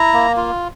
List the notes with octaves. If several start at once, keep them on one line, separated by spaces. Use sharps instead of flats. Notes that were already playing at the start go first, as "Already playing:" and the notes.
Already playing: E4 A#5
A#3
F4